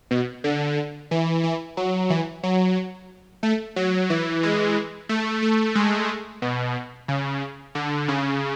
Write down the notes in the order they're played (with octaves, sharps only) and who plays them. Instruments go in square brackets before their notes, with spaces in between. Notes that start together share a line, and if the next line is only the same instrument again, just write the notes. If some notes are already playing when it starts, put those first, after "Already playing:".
[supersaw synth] B2
D3
E3
E3
F#3
E3
F#3
A3
F#3
E3
G#3
A3
A3
G#3
B2
C#3
D3
C#3